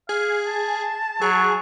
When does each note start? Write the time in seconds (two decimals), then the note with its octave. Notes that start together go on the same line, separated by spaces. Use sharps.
0.09 G#4 F5
0.47 A5
1.21 F#3 G#4